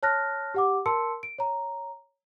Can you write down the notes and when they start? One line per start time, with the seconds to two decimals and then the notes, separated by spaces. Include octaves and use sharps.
0.03 C#5 A5 F6 F#6 A#6
0.54 G4 F#5 D6
0.86 A#4 A5 C6 E6 C#7
1.23 D7
1.38 C#5 A#5